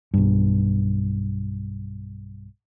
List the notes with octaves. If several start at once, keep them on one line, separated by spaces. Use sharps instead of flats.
B1 G2